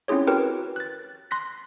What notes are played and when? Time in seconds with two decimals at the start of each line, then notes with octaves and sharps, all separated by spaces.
0.08 C4 C#4 E4 F4 G#4 C#5
0.27 F#4 G4 A#4 B4 G5
0.76 F#6 A6
1.31 C6 F#6 A#6 B6